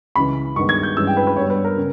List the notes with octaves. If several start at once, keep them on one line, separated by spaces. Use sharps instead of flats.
C#2 C#3 E3 B5
G2 D#3 G#3 B3 C#6
G#6
G6
G2 E3 G#3 C#4 E6
G5
B4
B4
G2 G3 B3 C#5
B4
A#4
C#3